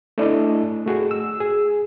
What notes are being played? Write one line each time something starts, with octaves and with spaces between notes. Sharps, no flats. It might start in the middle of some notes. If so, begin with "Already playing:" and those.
A3 D4 E4 D#5
A3 F#4 G#4
E6
G#4